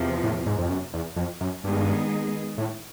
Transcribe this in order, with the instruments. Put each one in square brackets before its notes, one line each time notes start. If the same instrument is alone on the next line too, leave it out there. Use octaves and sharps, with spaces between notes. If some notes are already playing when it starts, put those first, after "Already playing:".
Already playing: [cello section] E2 C3 F3
[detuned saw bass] A2
G#2
F2
F#2
E2
F2
F#2
[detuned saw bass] G2 [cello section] D#3 G#3 B3 D#4 G#4
[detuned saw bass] A2